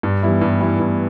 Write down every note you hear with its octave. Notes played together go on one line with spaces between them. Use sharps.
G2
E3 G3 B3 E4
G2
E3 G3 B3 E4
G2